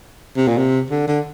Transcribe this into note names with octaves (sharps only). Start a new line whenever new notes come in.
C3
A#2
C3
D3
D3